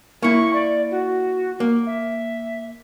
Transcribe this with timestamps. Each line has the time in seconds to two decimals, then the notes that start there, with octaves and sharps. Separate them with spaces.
0.23 A#3 E4 C#6
0.53 D5
0.91 F#4
1.60 A#3
1.86 E5